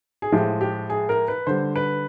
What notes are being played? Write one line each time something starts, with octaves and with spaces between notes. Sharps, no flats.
G#4
A2 F3 G#3 G4
G4
G#4
A#4
B4
D3 G3 C5
B4